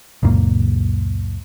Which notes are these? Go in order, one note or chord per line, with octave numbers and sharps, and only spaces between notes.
C#2 F#2 A#2 A#3